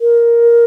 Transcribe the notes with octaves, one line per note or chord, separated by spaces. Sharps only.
A#4